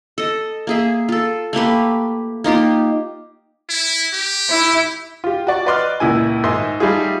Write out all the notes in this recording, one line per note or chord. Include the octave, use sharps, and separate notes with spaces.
A4 D#5
A#3 G#4 E5
F4 A4
A3 A#3 G4 B4
A#3 D#4 F4 G4
E4
G4
E4
F4 G4
F#4 D5 C#6
B4 D5 D#5 C6 D6 F6
C#2 A#2 E4 G#5
G#2 D#3 D#4 E5 C6
G3 A3 D#4 F4 G4 G#4